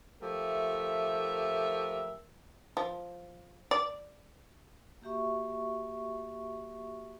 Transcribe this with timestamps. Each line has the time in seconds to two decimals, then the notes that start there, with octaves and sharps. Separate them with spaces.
0.21 F3 A3 G4 A#4 E5
2.77 F3
3.71 D5
5.02 A#3 F#4 G4 E5 C#6